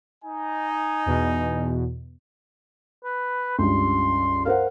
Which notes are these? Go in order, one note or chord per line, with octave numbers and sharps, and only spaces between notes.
D#4 G#5
E2 B2
B4
C#2 G2 C6
A#4 C5 F5 F#5